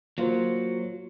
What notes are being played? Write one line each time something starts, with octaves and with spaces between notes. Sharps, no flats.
F#3 A#3 F4 C5